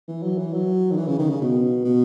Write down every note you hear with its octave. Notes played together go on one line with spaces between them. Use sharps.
E3
F#3
E3
F#3
D#3
E3
C#3
D#3
C#3
B2
B2